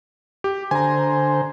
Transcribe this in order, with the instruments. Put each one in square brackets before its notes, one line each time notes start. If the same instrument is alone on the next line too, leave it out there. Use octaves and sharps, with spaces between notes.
[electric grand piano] G4
[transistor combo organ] D3 C5 [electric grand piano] G#5 A#5